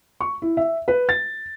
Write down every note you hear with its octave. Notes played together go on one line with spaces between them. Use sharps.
C#6
E4
E5
B4
A6